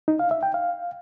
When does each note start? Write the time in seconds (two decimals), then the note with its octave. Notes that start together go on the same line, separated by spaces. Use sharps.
0.08 D#4
0.19 F5
0.31 E5
0.43 G5
0.54 F5